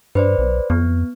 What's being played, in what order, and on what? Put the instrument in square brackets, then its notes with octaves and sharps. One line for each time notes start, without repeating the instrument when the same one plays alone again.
[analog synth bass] G2 [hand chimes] B4 C5 D5
[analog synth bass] B1
[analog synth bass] F2 [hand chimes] B3